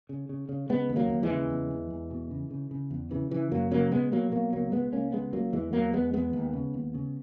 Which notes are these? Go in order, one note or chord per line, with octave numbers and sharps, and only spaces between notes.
C#3
C#3
C#3
C#3 G#3 B3
D#2
F#3 A#3
D#2
E3 G#3
C#3
E2
E2
E2
B2
C#3
C#3
C#3
E2
C#3 E3
C#3 E3
F#2 F#3 A#3
C#3 F#3 A#3
B2 G#3 B3
B2 F#3 A#3
B2 F#3 A#3
C#2 F#3 A#3
C#2 G#3 B3
C#2 A#3 C#4
C#3 G#3 B3
C#2 F#3 A#3
E2 E3 G#3
E2 F#3 A#3
E2 G#3 B3
E2 G#3 B3
D#2
C#3
D#2
C#3